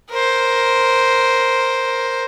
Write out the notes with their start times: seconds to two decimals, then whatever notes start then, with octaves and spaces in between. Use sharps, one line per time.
0.10 A#4 C5